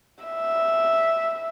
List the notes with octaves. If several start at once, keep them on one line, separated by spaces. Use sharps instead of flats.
E5